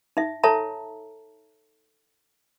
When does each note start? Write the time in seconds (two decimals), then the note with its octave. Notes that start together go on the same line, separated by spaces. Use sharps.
0.17 D#4 E5
0.44 A4 C#5 E5 A5 A#5